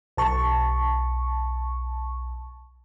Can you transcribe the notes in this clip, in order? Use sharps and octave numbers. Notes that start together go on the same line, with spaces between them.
B1 A5 C#6